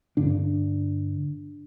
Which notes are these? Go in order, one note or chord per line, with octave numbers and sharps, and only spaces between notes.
G2 D3 D4